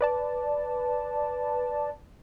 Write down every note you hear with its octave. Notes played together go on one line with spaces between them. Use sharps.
B4 D5 A5